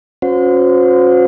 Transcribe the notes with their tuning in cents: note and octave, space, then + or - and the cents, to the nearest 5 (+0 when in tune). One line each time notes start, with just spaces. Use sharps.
C#4 -10 F#4 -40 C5 -35